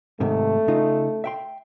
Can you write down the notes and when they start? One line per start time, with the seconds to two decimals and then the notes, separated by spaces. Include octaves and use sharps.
0.20 G#2 C3 D#3 A3
0.68 C#3 D#4 F4
1.24 E5 G5 C6